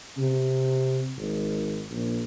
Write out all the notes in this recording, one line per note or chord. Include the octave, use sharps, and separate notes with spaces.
C3
G#1
A#1